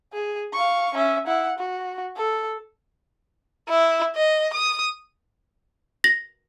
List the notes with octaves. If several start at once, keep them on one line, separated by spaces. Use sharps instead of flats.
G#4
F5 C#6
C#4 E5
E4 F#5
F#4
A4
E4
D#5
D#6
A#6